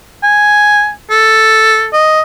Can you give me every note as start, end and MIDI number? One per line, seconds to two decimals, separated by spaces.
0.23 0.90 80
1.10 1.87 69
1.93 2.22 75